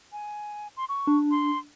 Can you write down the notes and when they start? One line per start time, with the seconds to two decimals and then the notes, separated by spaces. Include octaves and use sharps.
0.12 G#5
0.77 C6
0.89 C#6
1.07 D4
1.31 C6